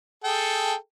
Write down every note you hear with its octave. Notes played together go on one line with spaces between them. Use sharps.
G#4 A4 G5